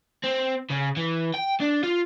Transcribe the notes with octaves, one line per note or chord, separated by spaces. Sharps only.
C4
C#3
E3
G5
D4
F4